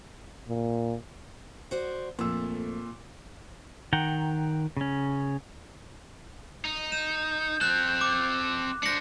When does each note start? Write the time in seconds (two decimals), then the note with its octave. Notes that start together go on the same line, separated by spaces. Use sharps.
0.48 A#2
1.71 F#4 C5 D5
2.19 F2 A#2 A3 E6
3.93 D#3 F#5 G5 A#5
4.77 C#3 C#4
6.65 D#4
6.92 G6 E7
7.61 C4 A4 F#6
8.01 D6
8.83 D4 C5 A#6 C#7